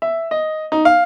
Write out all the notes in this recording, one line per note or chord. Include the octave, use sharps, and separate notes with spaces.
E5
D#5
D#4
F5